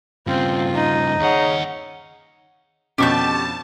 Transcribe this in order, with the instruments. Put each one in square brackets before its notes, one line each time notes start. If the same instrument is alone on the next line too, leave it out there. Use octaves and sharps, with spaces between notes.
[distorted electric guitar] G2 C#3 [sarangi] C4 [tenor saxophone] F4
[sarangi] D#4
[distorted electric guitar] D#2 F#5 [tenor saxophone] C#3
[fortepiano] F2 B2 D3 [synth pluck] C#4 [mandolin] G4 C#6 G6 [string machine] A5